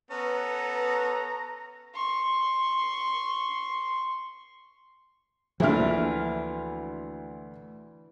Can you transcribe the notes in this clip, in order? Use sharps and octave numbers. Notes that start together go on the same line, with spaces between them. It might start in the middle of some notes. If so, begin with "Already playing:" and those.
B3 C#4 A4 B4 A#5
C6 C#6
D2 E3 F3 A#3 D4 E5 F6